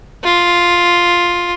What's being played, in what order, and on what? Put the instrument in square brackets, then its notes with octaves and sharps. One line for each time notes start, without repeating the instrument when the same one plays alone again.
[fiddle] F4